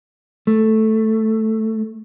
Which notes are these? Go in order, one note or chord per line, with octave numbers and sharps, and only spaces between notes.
A3